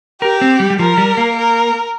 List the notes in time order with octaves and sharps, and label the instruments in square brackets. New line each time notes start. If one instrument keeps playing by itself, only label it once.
[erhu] G4 [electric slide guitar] A#4
[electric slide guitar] C4
G3
G3
[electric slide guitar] F3 [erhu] A#4
[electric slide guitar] G3
A#3
[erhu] A#4